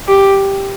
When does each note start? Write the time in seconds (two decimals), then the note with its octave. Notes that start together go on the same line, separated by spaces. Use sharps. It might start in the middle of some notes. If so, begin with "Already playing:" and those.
0.08 G4